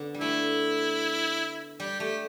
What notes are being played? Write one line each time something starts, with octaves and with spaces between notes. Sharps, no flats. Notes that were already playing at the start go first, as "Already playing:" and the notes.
Already playing: D3 B3
G3
A3 E4
G3 G4
A3 G4